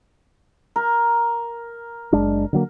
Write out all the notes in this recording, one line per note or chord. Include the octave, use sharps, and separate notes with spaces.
A#4
F#1 G#3 D4
D3 F#3 A#3